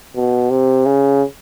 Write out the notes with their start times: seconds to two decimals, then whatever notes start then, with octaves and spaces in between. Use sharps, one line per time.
0.16 B2
0.50 C3
0.86 C#3